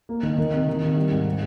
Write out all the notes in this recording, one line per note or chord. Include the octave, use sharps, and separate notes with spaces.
A#3
D#3
D#3
C3
D#3
C3
G3
G#2
C4